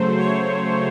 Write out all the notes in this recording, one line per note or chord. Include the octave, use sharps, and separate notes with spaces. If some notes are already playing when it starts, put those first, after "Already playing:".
Already playing: C#3 F#3 A3 C5
C#5